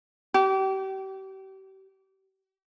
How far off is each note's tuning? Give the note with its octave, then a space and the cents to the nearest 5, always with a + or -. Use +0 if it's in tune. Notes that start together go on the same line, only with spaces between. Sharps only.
G4 -35